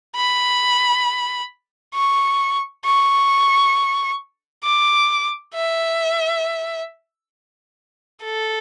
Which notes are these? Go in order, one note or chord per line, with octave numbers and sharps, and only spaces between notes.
B5
C#6
C#6
D6
E5
A4